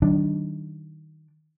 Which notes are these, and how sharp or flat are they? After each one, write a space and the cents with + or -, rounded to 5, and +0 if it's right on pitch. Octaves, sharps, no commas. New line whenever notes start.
D#3 +0 G3 -45 D4 +0